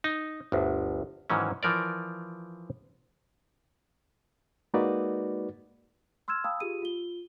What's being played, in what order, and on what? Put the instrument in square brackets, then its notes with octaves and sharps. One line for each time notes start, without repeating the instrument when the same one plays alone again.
[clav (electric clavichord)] D#4
G1 D2
G#2 D#3 E3 F#3 C#4
E3 F3 A#4 D5
[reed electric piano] G#3 A#3 D#4 F#4 B4 D5
[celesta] C6 E6 F6 G#6 E7
F5 G5 A5 B5 D#6 E6
F4 G4 G#4 D#7
F4 G7